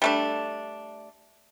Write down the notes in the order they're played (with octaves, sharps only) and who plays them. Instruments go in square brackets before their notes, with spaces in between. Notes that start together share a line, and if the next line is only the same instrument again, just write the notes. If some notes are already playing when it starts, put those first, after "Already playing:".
[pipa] G3 A3 D4